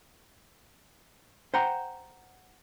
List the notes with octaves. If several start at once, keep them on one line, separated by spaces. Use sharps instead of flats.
C5 F#5 G5 A#5